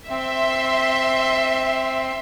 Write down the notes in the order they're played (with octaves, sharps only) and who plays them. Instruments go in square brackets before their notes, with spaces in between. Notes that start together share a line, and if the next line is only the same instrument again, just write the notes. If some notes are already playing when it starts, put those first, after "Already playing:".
[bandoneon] C4 [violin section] E5 C6